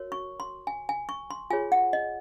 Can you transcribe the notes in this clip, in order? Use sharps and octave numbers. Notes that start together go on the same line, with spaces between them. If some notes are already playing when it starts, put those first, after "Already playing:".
Already playing: F#4 A#4 C#5
C#6
C6
G#5
G#5
C#6
C6
F4 G#4 C#5 G#5
F#5
D#5